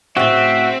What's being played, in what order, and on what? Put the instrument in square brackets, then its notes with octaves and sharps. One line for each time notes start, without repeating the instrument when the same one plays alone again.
[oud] A2 C#3 [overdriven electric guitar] C4 [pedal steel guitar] F#4 [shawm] E5